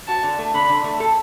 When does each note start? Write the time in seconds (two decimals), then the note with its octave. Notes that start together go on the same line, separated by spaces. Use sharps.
0.08 F#4 A5
0.23 D3
0.39 A3
0.54 D3 B5
0.69 D3
0.84 A3
1.00 A4